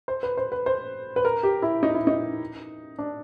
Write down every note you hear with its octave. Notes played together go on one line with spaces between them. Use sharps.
C5
B4
C5
B4
C5
B4
A#4
G4
E4
D#4
E4
D#4
D4